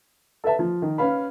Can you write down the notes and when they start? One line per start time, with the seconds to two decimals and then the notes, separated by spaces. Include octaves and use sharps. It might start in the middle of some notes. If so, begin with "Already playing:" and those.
0.44 A4 B4 E5 A5
0.59 F3
0.82 D#3
0.98 C#4 B4 F5 B5